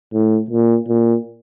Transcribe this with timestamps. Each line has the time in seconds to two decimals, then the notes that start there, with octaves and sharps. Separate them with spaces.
0.13 A2
0.50 A#2
0.88 A#2